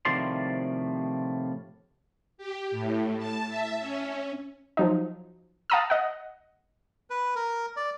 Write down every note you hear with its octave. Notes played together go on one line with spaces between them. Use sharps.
A2 C3 D#3 F3 D5 C6
G4
A2
A5
E5
C#4
F3 F#3 D#4
F5 A5 A#5 D#6 E6
D#5 F#5
B4
A#4
D5